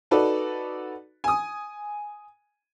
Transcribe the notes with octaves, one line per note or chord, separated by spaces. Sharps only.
D#4 F#4 A4 B4 D5
G#5 D#6